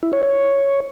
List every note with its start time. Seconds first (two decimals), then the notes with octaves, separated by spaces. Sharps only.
0.03 E4
0.13 C#5
0.23 C#5